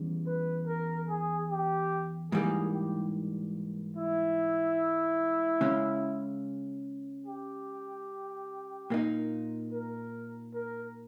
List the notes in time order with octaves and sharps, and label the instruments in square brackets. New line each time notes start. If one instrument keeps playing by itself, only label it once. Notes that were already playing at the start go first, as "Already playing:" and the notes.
Already playing: [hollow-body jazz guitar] E2 C#3 G3
[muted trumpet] B4
A#4
G#4
G4
[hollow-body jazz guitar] G#2 E3 G3 A#3 [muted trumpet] G#4
[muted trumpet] G4
E4
[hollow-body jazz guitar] C#3 G#3 C#4
[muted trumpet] G4
[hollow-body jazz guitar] A#2 A#3 D#4
[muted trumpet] A#4
A#4